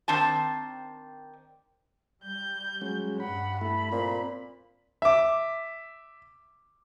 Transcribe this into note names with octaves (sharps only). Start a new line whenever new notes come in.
D#3 C4 D4 A5
G3 G6
F#3 G#3 C#4
G2 F#5 B5
A3 E4 B5
A#2 C4
E5 D6